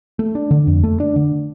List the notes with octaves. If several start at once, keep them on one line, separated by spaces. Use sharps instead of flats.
A3
D4
D3
F2
A3
D4
D3